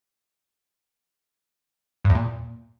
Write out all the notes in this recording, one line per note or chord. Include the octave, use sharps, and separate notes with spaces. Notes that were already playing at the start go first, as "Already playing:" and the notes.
G2
E2
A#2